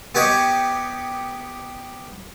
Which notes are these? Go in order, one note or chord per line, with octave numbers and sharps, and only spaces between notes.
B3 G4 C#5 D#5